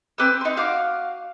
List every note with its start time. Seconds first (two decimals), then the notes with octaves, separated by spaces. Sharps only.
0.18 C4 B4 D6 E6
0.41 D#4 C6
0.56 F#4 F5 D6 F6